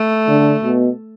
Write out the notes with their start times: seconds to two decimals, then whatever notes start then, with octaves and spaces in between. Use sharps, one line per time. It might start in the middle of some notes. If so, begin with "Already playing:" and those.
Already playing: A3
0.27 D3
0.63 B2